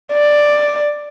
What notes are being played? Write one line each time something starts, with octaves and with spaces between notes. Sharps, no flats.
D5